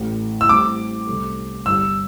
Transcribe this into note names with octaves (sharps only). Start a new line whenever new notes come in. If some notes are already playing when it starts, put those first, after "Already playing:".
Already playing: A1 A2 A3
E6
A2 G3 C4 D6
C2 C3 A3
G1 G2 G3 D4 E6